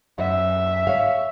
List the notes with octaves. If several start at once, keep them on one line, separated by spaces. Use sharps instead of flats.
F#2 E5
C#5 F5